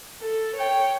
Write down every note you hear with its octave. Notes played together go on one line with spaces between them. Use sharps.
A4
C#5 G5